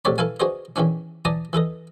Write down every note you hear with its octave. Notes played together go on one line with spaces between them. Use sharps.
A#1 C3 A3 C#5 D5 B5
E4 A4 B4 F5 G#5
D4 F#4 G#4 B4 C5 D#5
E2 D#3 E3 C#4 D4
E3 D5 A5 A#5 D#6
E3 A4 B4 D#5